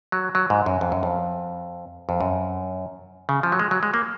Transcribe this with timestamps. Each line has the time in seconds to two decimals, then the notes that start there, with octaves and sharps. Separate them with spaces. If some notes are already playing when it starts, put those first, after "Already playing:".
0.12 F#3
0.35 F#3
0.50 G#2
0.66 F#2
0.81 F2
0.92 F#2
1.03 F2
2.09 F2
2.21 F#2
3.29 C#3
3.43 F3
3.52 F#3
3.59 G#3
3.71 F#3
3.83 G#3
3.94 A#3